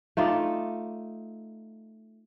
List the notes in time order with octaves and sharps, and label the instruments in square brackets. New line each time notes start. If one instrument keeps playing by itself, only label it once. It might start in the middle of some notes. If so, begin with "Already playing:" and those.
[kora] A3 D#4 F4 D5